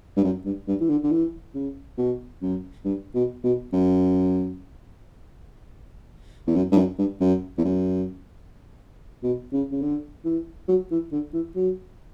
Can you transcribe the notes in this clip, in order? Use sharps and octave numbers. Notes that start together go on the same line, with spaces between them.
G2
F#2
G2
G2
E3
D3
D3
E3
C#3
B2
F#2
G2
B2
B2
F#2
E2
F#2
G2
F#2
G2
F#2
E2
F#2
B2
C#3
C#3
D3
E3
F#3
E3
D3
E3
F#3